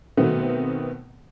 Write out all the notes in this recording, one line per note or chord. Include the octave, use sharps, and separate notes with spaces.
B2 D#3 A3 B3 C4